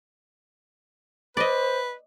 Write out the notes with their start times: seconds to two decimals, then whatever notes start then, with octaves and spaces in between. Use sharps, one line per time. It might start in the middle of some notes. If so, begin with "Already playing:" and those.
1.37 B4 C5 D5 D#5